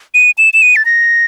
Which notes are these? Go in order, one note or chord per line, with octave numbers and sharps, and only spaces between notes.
D#7
E7
E7
D#7
A6
A#6